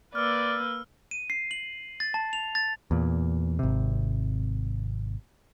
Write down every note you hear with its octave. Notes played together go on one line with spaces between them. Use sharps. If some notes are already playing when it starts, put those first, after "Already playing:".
A#3 B4 D5 E6 F6
D#7
C7
F#7
A6
A5
F7
A6
E2 A#2
G#1 C3